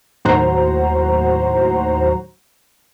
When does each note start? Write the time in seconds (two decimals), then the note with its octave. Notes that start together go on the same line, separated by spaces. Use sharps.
0.25 D#2 A2 F#3 F#4 C5 A#5